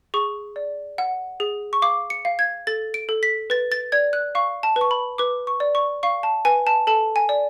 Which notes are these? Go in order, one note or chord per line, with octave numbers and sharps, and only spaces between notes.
G#4 C#6
D5
F#5
G#4
C#6
F5 D6
C#7
F5
G#6
A4 A6
D7
A4
B6
B4 A6
A6
D5 G#6
F#6
F5 C#6
A5
B4
C#6
B5
B4 D6
C#6
D5
C#6
F5 C#6
A5
B4 G#5
A5
A4 A5
G#5
D5